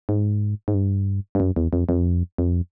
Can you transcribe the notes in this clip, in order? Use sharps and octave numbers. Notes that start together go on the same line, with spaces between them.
G#2
G#2
G2
G2
F#2
E2
F2
F2
F2